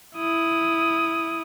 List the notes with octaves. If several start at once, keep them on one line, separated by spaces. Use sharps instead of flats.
E4 D#6